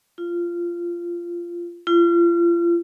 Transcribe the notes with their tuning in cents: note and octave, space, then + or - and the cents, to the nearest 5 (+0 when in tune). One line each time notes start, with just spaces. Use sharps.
F4 -15
F4 -35